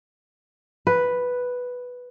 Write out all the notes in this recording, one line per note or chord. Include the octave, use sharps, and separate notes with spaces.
B4